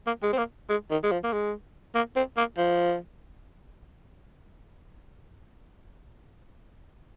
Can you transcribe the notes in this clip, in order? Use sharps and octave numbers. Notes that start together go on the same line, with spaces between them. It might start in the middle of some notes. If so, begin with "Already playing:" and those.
A#3
G#3
C4
A#3
G#3
D#3
G#3
F3
A#3
G#3
A#3
C4
A#3
F3